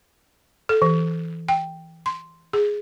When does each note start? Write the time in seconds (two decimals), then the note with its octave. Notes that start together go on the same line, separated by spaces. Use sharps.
0.69 A4
0.82 E3
1.48 G5
2.06 C6
2.53 G#4